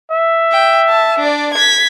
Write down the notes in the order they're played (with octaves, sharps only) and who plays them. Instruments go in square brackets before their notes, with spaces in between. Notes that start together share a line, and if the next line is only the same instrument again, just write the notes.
[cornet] E5
[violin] G5
A5
D4 D5
G#6 B6